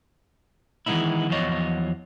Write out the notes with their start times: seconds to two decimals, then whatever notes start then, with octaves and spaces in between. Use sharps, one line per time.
0.86 D#3 E3 G#3 B3 D#4 E4
1.30 E2 F3 F#3 F4 C#5 D#5